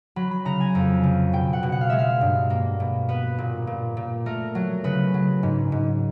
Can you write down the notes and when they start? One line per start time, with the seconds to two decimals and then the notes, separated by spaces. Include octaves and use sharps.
0.16 F#3 B5
0.31 B5
0.45 C#3 A#5
0.60 G#5
0.75 F2
1.04 C#3
1.33 B2 G5
1.53 F#5
1.63 B2
1.72 F#5
1.81 F5
1.90 G#3 E5
1.99 F5
2.21 G2
2.50 A#3
2.80 B2
3.09 B3 B4
3.38 A#2
3.67 A#2
3.97 A#2
4.26 A3 A#4
4.55 F#3
4.84 C#3 B4
5.14 F#3
5.43 G#2
5.72 G#2